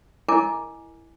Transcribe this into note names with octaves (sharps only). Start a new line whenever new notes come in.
E4 A#4 D#5 G#5 D6